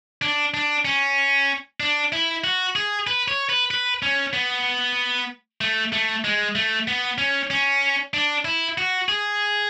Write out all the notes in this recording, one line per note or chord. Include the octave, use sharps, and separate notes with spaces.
D4
D4
C#4
D4
E4
F#4
G#4
B4
C#5
B4
B4
C#4
B3
A3
A3
G#3
A3
B3
C#4
C#4
D4
E4
F#4
G#4